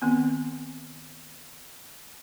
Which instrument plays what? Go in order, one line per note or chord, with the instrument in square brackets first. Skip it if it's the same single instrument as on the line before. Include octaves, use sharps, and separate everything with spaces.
[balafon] D#3 B3 C4